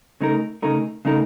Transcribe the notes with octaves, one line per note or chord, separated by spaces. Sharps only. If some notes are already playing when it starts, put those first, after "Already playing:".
C#3 A3 D#4 A#4
C#3 A3 D#4 A#4
C#3 A3 D#4 A#4